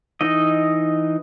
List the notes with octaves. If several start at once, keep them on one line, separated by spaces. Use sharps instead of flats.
E3 D#4 D#5